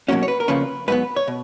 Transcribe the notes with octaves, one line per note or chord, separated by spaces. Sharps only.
B2 F#3 A#3 C#4 F#4
C#5
B4
A#4
F2 C#3 F3 A#3 C#4 B4
G#2 F#3 B3 B4
C#5
B2